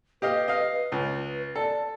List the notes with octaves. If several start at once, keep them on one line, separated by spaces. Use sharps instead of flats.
G4 B4 D#5 F5
D#5 F5
C#2
A4 D5